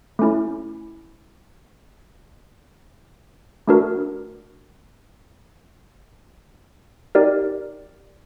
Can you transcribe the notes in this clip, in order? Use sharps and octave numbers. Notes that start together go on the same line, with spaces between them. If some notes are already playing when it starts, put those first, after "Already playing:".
A3 C#4 E4
A3 D4 F#4 A#4
D#4 G4 A#4 D5